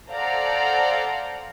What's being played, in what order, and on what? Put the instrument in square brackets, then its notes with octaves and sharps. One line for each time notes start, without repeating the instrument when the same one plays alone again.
[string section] A4 C5 D5 F5 F#5 A#5